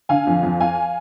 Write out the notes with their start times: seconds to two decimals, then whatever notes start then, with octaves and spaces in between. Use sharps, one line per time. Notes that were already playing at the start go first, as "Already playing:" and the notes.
0.09 D3 F5 G#5
0.27 F2
0.43 F2
0.60 F2 F5 G#5